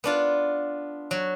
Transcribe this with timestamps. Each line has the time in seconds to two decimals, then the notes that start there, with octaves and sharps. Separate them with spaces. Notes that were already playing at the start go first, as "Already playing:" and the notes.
0.04 B3 D4 F4
1.11 F#3